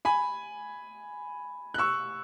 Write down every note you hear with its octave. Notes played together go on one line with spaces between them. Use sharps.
G#5 B5
F#6
C#6 E6